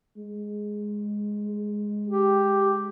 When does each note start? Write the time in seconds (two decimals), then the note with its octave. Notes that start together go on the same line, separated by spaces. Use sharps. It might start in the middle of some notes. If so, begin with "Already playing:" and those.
0.17 G#3
2.08 G4